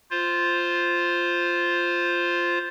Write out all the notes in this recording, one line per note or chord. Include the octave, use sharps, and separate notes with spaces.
F4 C5